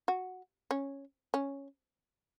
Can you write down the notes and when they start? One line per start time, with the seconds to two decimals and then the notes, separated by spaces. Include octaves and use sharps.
0.08 F#4
0.71 C#4
1.34 C#4